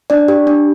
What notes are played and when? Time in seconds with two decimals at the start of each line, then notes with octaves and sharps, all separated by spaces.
0.10 D4 D5
0.28 G4
0.47 D4